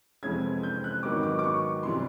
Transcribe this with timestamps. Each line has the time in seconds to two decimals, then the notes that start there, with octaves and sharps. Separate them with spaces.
0.23 F2 C3 E3 G#3 C4 G#6
0.63 G6
0.84 F#6
1.03 G#2 D#3 F#3 B3 D6
1.23 D6
1.39 D6
1.44 C#6
1.83 C3 E3 G3 C6